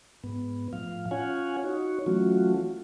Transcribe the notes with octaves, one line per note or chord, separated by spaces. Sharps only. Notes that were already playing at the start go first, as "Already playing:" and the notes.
G#2 B3
A2 F3 F5
C#4 F4 C#5 F5 F#5 G#5
D#4 F#4 C#5
E3 F#3 A3 C#4 F4 F#4